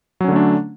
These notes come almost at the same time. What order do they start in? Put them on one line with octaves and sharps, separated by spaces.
F#3 C#4 D3 A3 D4